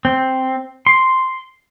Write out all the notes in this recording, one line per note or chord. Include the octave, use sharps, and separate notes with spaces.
C4
C6